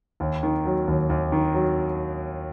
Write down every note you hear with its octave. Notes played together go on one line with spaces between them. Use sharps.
D#2
D#3
F#3
D#2
D#2
D#3
F#3